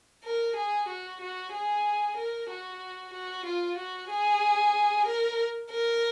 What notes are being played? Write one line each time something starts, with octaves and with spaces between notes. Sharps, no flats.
A#4
G#4
F#4
F#4
G#4
A#4
F#4
F#4
F4
F#4
G#4
A#4
A#4